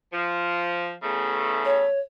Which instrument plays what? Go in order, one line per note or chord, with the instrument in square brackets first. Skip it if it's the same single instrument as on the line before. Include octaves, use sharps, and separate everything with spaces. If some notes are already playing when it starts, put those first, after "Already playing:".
[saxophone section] F3
E2 C#3 A3
[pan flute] C#5